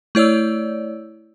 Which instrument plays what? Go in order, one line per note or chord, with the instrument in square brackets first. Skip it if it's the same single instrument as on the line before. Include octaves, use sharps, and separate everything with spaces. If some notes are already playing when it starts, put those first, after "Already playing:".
[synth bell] A3 E4 C#5 D5 E6